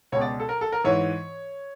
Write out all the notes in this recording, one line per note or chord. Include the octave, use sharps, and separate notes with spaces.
C#2 B2 C#5
D5
A4
A#4
A4
A#4
G#2 E3 C#5